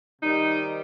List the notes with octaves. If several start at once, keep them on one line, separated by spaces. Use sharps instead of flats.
C3 D#3 G3 D#4